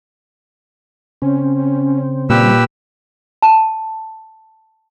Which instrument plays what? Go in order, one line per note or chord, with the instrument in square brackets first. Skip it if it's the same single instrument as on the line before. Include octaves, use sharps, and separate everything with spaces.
[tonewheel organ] C#3 C4 [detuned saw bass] C#4
[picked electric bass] A#2 [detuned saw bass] G3 [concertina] G4 B4 E6
[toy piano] A5